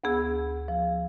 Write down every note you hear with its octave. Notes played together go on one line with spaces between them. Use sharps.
D2 B3 G#4 E6
F3